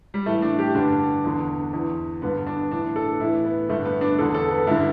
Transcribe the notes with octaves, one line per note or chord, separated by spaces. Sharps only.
G3
A2 E3 A3
D4
G4
G2 D3 D4
E2 D3
E2 E3
G2 D3 B3
D4
A2 E3 D4
A4
A2 E3 E4
B3
G2 D3 A3
B3
D4
E2 D3 A4
A4
B3
G2 D3 E4